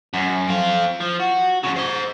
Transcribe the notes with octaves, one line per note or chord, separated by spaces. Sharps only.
F#2
C4 F4
F3
F#4
F2 C#3
C5 D#5